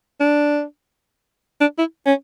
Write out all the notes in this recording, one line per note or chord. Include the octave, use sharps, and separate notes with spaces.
D4
D4
E4
C#4